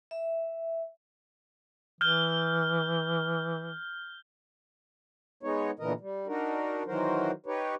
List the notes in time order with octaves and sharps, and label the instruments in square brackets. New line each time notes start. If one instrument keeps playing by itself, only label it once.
[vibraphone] E5
[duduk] E3 [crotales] F6 G6 G7
[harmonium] G#3 B3 D#4 C#5
A#2 D3 E3 B3 A#4 D#5
G3
D4 D#4 F#4 A#4
D#3 E3 F#3 F#4 A#4 C5
D#4 G4 B4 C#5